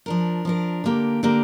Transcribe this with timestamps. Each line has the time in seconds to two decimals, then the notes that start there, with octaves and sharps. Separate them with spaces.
0.06 F3 D4 A#4
0.45 F3 D4 A#4
0.84 D3 A#3 G4 A#4
1.23 D3 A#3 G4 A#4